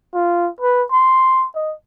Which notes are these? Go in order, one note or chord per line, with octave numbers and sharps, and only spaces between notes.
F4
B4
C6
D#5